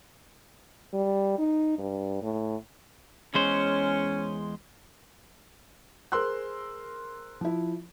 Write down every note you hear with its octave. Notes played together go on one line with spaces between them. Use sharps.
G3
D#4
G2
A2
E2 G#3 C#4 C5
G#4 A#4 C5 C6 E6 F#6
F3 E4